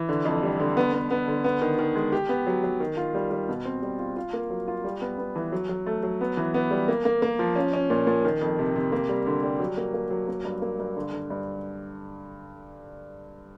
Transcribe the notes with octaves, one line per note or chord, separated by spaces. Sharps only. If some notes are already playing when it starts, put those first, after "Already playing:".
Already playing: E3
D3
F2
G3
D3
B3
B3
B3
D3
B3
D#3
D#3
G#3
G4
B3
F#3
F#3
D#3
F4
G3
G3
B2
C4
G3
F4
F4
A#3
F#3
F4
G3
B3
B3
E3
F#3
F#3
A3
F#3
B3
E3
B3
G3
A#3
A#3
A#3
F3
C#4
C#4
A#2
A#2
D#3
F2
C3
C3
A#3
G3
D3
G3
F#3
A#3
A#3
F#3
A#3
G2
A#3
G2
D3
D3
G2